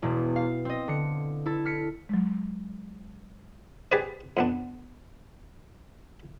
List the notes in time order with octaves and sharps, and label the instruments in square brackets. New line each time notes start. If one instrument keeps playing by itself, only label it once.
[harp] E1 E2 B2
F5
C4 D#5
D3 C#7
E4 A4
F6 B6 C#7
[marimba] F#3 G#3
[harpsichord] G4 G#4 B4 C5 D5
F2 B3 D4